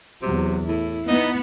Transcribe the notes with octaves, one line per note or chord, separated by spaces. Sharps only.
E2 C3 F#3
A2 E4
B3 D#4